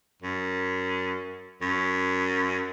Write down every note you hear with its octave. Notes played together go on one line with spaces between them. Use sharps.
F#2
F#2